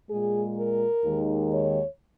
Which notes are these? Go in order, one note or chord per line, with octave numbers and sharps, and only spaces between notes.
A#2 G#3 G#4
A#4
D#2 D#3 G#3
C#5